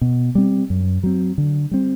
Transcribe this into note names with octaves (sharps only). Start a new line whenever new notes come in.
B2
G3 C4
F#2
F#3 C4
D3
G3 C4